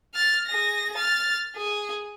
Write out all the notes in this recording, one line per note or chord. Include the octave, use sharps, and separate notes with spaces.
F6 A6
G#4 A#6
F6 A6
G#4